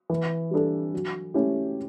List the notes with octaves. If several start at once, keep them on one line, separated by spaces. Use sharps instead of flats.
E3
G3 D4 A4
F#3
A3 C#4 E4 G4